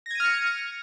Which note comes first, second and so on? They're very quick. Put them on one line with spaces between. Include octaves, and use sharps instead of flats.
A#6 G#6 D#7 F6 C#7